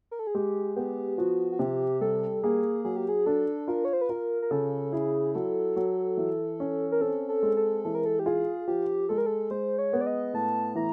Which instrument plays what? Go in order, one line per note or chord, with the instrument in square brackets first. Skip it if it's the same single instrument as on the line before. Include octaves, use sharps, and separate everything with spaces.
[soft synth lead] A#4
A4
G#4
[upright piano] G#3 [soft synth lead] G4
[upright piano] B3 [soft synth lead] G4
[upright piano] F3 [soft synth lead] F#4
[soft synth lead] F#4
[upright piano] C3 [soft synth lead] G4
[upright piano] G3 [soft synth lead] A4
[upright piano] A#3 [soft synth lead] G#4
[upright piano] F#3 [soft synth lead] G#4
[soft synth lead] G4
G#4
[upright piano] D4 [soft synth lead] A4
[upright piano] F4 [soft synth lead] A#4
[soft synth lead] C#5
C5
B4
[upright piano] F4 [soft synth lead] A#4
[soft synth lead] A#4
[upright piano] C#3 [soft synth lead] A4
[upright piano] E4 [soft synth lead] G#4
[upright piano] F#3 [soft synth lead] A4
[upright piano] F#3
E3
C#4
[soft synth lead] A#4
[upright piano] C4 [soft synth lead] A4
[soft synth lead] A4
[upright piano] G#3
[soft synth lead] A4
[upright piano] E3 [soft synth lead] A4
[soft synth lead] A#4
A4
G4
[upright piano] F4 [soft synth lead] G#4
[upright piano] F3 [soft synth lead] G4
[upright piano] G#3 [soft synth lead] A4
[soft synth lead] A#4
A4
[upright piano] G#3 [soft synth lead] C5
[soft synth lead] C#5
[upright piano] B3
[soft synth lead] D5
D#5
[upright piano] A2 [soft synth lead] A5
[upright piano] E3 [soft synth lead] A#5